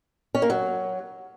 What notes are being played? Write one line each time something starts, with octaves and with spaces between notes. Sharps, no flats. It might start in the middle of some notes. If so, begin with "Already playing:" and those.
C#4
A#3
F#3